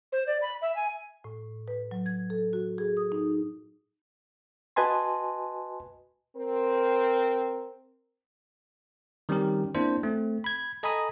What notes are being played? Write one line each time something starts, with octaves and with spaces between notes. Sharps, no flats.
C5
D5
B5
E5
G#5
A2
B4
F#3
G#6
A4
F#4
G#4
D#6
D#4
F#4 B4 D#5 G#5 A5 C6
C4 A#4
D#3 G3 C4 C#4 G4 A#4
A#3 C4 D4 E4 C5
A3 C4
B5 G#6
A4 D#5 G#5 A#5 B5 D#6